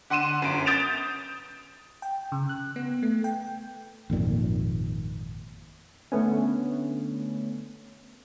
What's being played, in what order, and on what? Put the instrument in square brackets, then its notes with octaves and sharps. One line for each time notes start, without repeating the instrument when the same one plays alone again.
[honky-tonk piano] D3 F#5 C6 D#7 E7
G1 F#2 D7
D#6 G6 A6 D7 E7 F7
[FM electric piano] G5
C#3
F#6
B3
A3
G5
[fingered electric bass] G#1 F2 A#2 D#3
[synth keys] D3 A3 B3 C#4